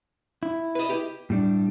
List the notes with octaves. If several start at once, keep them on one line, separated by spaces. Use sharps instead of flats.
E4
B4 D#5
G4
A2 G3 D4